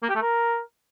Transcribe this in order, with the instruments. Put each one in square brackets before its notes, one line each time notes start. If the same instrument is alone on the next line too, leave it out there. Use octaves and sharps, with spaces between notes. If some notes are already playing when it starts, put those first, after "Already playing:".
[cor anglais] A#3
G4
A3
A#4